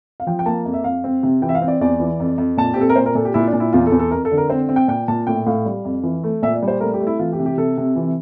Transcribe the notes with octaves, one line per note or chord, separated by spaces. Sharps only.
F5
F3 G5
G5
A#3 A5
F2
E5
F2 F5
C4
C3
E3 G5
E5
F5
C4
D5
E2 D5
E3
F2
F2
A#2 A5
G4
C4 A4
A#4
A#2 C5
A#4
A#2 A4
G4
A#2 E4
D4
A#2
E4
E2 F4
A4
E2
A4
F2 A#4
A4
D3
A#4
C4 C5
C4
G5
A#2 G5
A#2 A5
A2 G5
A2 F5
G3
F2
E3
A3
A#2 E5
D5
G3
C5
A3 A#4
G4
A3
E4
E3 F4
G4
C3
G4
C3 A4
C3
E3